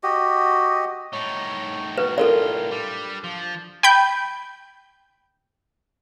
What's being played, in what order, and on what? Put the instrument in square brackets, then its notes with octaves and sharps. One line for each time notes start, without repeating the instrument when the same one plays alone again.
[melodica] F#4 G4 D#5
[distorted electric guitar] A2 D#4 [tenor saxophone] C#5
[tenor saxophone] F#4 [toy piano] B4
[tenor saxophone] F4 [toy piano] A4 A#4 D5
[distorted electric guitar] G3 [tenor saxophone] D4
[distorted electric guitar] F3
[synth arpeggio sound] G5 B5 G6